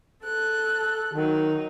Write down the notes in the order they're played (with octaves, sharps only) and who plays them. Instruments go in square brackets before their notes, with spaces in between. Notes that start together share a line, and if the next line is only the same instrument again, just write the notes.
[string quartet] A4 F#6
[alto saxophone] D#3 [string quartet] F#3 D#4